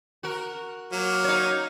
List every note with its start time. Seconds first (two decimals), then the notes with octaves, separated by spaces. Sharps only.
0.23 F#4 A#4
0.92 F#3 A#3 F6
1.24 D#4 C#5